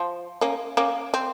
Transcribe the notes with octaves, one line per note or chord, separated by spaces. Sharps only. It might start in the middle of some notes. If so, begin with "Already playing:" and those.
Already playing: F3
A#3 C#4
A#3 C#4
C4